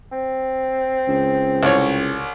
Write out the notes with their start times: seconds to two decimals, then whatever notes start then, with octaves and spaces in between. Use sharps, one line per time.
0.12 C4
1.08 C#2
1.63 C2 C#5